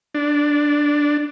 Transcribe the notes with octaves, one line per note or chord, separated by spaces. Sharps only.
D4